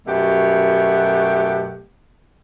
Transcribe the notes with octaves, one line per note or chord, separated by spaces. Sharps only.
F#2 B2 A3 G4 F#5